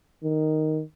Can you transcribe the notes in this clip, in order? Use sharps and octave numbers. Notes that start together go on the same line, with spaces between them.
D#3